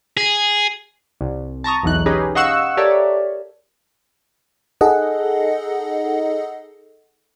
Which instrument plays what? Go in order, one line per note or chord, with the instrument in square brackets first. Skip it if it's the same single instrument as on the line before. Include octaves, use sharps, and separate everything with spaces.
[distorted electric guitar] G#4
[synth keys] C2
A5 A#5 C#6 D#6
B1 E2 E3 D#4 F#6
C#4 D#4 G4 G#4 B4
D#5 F5 F#5 C#6 E6 F#6
G4 A4 A#4 C#5 D5 E5
[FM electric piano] D#4 G#4 A4 D#5 F#5